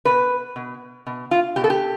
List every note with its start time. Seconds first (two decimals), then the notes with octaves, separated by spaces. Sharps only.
0.05 B2 B4
0.56 B2
1.07 B2
1.31 F4
1.56 B2 G4
1.64 A4
1.70 G4